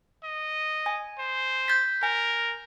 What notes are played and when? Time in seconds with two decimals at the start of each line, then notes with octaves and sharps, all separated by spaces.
0.24 D#5
0.86 G#5
1.19 C5
1.68 G6 A6 B6
2.03 A#4 G#5